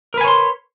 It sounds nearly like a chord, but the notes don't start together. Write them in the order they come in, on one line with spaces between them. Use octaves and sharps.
A#4 B4 G#5 C#5 C6